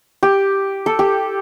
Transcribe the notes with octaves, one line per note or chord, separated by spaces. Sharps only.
G4
A4
G4